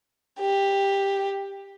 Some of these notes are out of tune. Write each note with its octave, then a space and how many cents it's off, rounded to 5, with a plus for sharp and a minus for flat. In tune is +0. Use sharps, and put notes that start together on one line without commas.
G4 +10